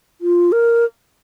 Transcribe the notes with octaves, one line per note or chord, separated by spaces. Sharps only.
F4
A#4